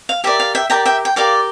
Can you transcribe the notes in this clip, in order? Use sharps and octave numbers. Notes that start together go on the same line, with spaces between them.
F5
G4 A#4 D5 E5
F5
E5 G5
G4 A#4 D5 G5 A#5
E5 G5
G5
G4 A#4 D5 F5